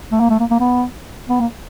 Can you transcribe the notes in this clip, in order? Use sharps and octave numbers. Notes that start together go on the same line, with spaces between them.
A3
A#3
A3
A#3
A#3
B3
B3
A#3